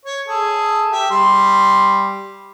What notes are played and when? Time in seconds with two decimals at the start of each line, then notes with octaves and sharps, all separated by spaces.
0.05 C#5
0.27 G#4 A4
0.92 G4 E5
1.11 G3 C6